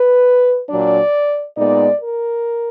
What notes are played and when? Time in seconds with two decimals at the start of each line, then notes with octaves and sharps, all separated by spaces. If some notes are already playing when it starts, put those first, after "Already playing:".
Already playing: B4
0.69 A#2 F#3 D4 D5
1.57 A#2 G#3 B3 D#4 D5
2.00 A#4